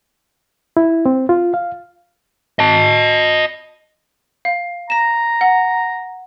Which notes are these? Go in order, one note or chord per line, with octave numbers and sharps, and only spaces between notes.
E4
C4
F4
F5
D#5 A5
F5
A#5 A#6 E7
F#5